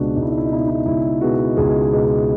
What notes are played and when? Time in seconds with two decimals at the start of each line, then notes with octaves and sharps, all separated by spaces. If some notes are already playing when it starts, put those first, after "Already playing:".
Already playing: C#2 B2 G#3 D4 F#4
0.16 C#2 D#4
0.23 E4
0.30 D#4
0.38 E4
0.45 D#4
0.50 B2 G#3 E4
0.59 D#4
0.68 E4
0.75 D#4
0.86 C#2 E4
1.21 B2 G#3 F#4
1.57 C#2 G#4
1.92 B2 G#3